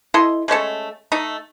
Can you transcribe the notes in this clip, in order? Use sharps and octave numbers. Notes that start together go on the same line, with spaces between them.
E4 A4 D#5 C6
G#3 A3 C#4 A4
A3 D#4